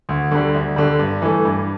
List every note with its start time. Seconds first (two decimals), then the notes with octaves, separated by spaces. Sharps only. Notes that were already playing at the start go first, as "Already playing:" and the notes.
0.09 D2
0.32 D3 G3
0.54 D2
0.76 D3 G3
0.99 G2
1.22 E3 A3
1.45 G2